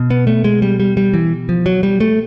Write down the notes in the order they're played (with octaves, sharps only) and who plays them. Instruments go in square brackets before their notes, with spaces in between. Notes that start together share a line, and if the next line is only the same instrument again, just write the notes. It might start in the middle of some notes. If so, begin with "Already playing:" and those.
Already playing: [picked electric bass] B2
B3
A3
G#3
G3
G3
G3
E3
F3
F#3
G3
A3